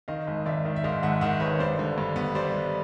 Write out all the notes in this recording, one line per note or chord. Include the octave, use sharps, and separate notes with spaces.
D#3 D#5 F5
G#1
G#1 D5 E5
D#3
E5
G#2 D#5 F5
G#1 E5 F#5
D#3 E5 F#5
G#1 B4 C#5
G2 C5 D5
D3
G2
B3
G3 C5 D5
G3